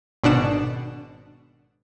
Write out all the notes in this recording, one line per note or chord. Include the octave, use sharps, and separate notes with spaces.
G#1 B2 D4 F#5 E7